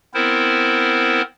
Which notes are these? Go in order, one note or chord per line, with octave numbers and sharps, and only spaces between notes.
B3 C4 E4 A#4 C5